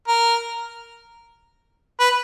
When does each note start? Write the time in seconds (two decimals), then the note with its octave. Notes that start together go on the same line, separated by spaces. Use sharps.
0.08 A#4
2.00 B4